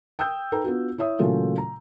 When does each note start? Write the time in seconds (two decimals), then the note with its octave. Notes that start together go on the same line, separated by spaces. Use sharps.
0.19 G5 D#6 E6 G6
0.52 D#4 A4 B4 G5 A#5
0.64 B3 D4 F4 F#4
0.98 E4 C#5 E5 D#6
1.19 A#2 C#3 E3 F#3 A3 F4
1.58 A#5